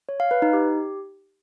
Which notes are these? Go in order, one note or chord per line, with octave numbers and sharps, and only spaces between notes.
C#5
F5
B4
D#4
G4